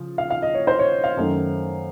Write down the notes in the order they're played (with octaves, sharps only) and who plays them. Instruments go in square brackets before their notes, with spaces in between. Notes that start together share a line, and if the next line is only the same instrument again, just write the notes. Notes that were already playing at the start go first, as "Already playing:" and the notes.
Already playing: [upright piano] C#3 F3
F5
F5
D#5
C#5
C5
C#5
F5
F#2 D#3 A3